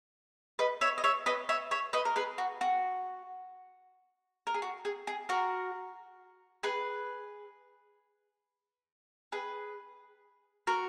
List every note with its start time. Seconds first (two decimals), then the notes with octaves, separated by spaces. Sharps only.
0.59 B4 D#5
0.81 C#5 E5
0.98 D#5
1.04 C#5 E5
1.26 B4 D#5
1.49 C#5 E5
1.71 C#5 E5
1.93 B4 D#5
2.05 A#4
2.16 G#4 B4
2.38 F#4
2.61 F#4
4.47 A#4
4.54 G#4
4.62 F#4
4.85 G#4
5.07 G#4
5.29 F#4 A#4
6.63 G#4 B4
9.32 G#4 B4
10.67 F#4 A#4